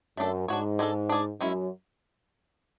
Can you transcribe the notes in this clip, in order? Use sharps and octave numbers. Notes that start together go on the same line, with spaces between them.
F#2 A3 D4 A4
G#2 D4 F#4 C#5
G#3 D4 A4
D4 G#4 D5
F#2 G#3 C#4 E4